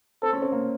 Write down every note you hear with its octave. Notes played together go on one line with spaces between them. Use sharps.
C4 A4
C#4
C4
A#3